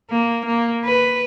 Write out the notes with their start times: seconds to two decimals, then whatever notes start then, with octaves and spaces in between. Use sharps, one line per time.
0.11 A#3
0.46 A#3
0.85 B4